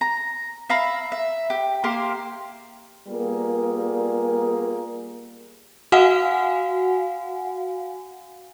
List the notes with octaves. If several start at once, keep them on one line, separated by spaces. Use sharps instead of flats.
A#5
E5 F5 A#5 B5
E5
G4
A#3 G4 A#4 C6
G3 A#3 B3 F4 G#4 A#4
F#4 F5 F#5 G#5